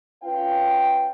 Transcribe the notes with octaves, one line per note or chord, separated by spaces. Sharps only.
C#4 F4 B4 F5 G5